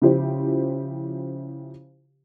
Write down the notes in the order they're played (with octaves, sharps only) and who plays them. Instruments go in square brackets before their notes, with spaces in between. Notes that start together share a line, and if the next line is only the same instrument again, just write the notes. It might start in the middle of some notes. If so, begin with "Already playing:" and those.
[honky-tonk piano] C#3 F3 E4 G4 C5